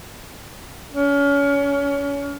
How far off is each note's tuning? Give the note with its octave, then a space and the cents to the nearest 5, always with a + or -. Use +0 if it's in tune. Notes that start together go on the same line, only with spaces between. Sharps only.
C#4 +30